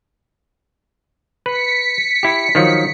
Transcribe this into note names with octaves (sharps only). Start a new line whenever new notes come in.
B4 B6 C#7
E4 G4
D#3 F3 F#3